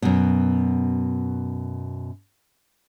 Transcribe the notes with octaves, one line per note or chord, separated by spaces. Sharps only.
F#2 B2